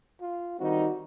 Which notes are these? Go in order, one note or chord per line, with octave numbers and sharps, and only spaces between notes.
F4
D#3 G3 C4 D#4 F#4